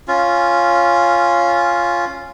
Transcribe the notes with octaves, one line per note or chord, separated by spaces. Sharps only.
C#4 F4